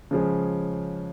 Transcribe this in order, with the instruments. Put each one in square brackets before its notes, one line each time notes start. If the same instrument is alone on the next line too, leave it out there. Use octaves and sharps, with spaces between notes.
[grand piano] C#3 F3 G#3 C#4